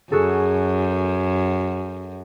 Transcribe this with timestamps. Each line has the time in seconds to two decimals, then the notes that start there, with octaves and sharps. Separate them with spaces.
0.12 F#2 F#4 G#4 A4